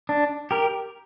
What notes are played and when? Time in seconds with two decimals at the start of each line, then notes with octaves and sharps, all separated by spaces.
0.09 D4
0.51 G4 A#4